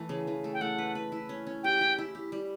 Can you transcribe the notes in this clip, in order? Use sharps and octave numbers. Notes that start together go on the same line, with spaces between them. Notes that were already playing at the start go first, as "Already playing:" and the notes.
Already playing: E3 A3
C#3
E3
A3
G5
A3 F#5
B4
B4
E4
C#4
C#4
G4 G5
G4
E4
G4
G3